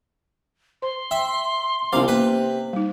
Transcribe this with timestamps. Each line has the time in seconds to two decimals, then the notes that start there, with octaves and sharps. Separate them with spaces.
0.82 C5 C6
1.11 E5 G5
1.93 C2 C3 B3 C#4 F5 D6
2.08 A#3 B4
2.73 G3 D#4